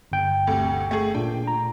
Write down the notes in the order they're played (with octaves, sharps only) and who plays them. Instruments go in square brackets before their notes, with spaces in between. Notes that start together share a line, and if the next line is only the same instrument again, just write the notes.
[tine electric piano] G1 G5
[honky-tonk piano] D2 C3
A3 G#4
[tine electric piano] A#2 D4 [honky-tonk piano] G5
[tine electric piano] A#5